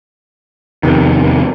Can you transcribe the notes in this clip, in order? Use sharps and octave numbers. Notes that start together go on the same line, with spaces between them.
F1 E2 C3 D#3